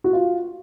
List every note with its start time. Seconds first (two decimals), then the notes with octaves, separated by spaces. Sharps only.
0.04 F#4
0.13 F4